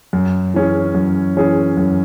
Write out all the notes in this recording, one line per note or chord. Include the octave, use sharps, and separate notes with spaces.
F#2
E3 C#4 G#4
F#2
E3 C#4 G#4
F#2